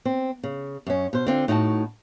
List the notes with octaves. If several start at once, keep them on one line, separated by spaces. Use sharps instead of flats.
C4
C#3
F#2 C#4
B2 C5
D3 C4 F4
A2 D#4 F#4 G#5 A5